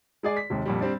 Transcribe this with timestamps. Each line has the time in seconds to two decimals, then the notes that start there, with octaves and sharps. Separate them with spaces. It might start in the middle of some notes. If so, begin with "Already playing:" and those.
0.23 G#3 G#4 D5
0.37 B6
0.50 D#2 G#2 C3
0.66 F2 A#2 G3
0.81 G3 C4 D4